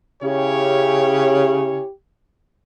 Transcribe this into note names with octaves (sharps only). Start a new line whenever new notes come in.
C#3 C#4 E4 G4 C#5